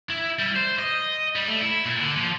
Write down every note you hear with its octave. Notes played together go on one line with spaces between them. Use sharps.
E4
G3
C5
D#5
G3
A3
E4
A#2
D3
F3